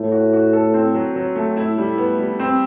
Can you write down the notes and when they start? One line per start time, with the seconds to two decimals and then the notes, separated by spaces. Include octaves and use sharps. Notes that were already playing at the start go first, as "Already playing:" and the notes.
Already playing: A2 A3
0.12 F#4
0.33 F#4
0.53 A4
0.74 C4
0.94 F#3
1.16 F#3
1.36 A3
1.56 A2 E4
1.78 G3
1.98 B3
2.19 G3
2.40 C4